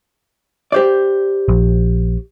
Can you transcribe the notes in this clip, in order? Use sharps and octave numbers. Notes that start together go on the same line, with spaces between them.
G4 C5 D5
A#1